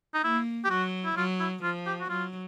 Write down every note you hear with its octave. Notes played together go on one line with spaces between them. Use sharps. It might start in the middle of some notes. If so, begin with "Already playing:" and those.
D#4
A#3 E4
G4
F#3 F#4
E4
F#3 F4
E4
F3 F4
G4
F#4
F#3 F4